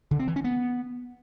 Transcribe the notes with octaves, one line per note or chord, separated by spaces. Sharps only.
D3
C4
E3
C#4
B3